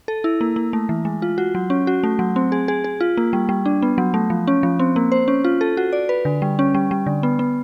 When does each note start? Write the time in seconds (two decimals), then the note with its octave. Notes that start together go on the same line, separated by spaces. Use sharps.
0.08 A4
0.24 E4
0.41 A#3
0.56 A#3
0.73 A3
0.89 E3
1.05 G#3
1.22 F4
1.38 F#4
1.55 F#3
1.70 C#4
1.87 F#4
2.03 A3
2.19 F#3
2.36 C4
2.52 G#4
2.68 G#4
2.84 G#4
3.00 F4
3.17 A#3
3.33 G3
3.49 G3
3.65 D4
3.82 B3
3.98 F#3
4.14 A3
4.30 F3
4.47 C#4
4.63 F3
4.79 C4
4.96 A#3
5.12 C5
5.28 C#4
5.44 F4
5.61 A4
5.77 F#4
5.93 D5
6.09 B4
6.25 D3
6.42 G3
6.59 C#4
6.74 G3
6.91 G3
7.06 D3
7.23 B3
7.39 B3